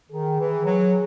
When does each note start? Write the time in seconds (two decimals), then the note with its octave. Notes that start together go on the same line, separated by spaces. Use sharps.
0.11 D#3 G#4
0.39 E3
0.65 F#3